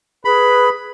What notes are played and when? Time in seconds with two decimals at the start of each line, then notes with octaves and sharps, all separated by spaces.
0.25 G#4 B4 B5